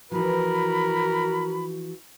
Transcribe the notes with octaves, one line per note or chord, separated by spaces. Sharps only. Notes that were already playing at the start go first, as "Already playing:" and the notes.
E3 F3 F#4 A#4 B5